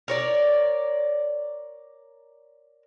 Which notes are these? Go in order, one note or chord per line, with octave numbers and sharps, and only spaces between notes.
A#4 C#5 D5